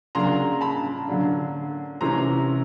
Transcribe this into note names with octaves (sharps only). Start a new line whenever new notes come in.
C#3 F#3 A#3 D4 A#5 C6
A5 B5
D3 F#3 A#3 D4
C3 E3 A3 C#4 A#5 C6